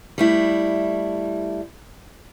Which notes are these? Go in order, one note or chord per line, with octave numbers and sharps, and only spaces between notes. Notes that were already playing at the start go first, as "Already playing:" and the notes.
G3 A3 E4